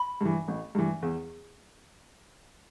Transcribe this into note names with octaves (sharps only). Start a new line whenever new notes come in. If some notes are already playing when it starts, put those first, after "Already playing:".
Already playing: B5
G2 E3
A1
G2 E3
E2